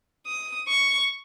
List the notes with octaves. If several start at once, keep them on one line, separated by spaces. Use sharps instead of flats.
D#6
C#6